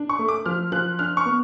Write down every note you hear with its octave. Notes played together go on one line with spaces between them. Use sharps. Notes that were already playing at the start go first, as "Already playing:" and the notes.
Already playing: D4
C#6
A3
D6
F3 F6
F3 F#6
D4 F6
C#6
B3